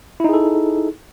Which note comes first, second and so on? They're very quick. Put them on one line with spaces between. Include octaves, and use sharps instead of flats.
E4 D#4 G#4 A4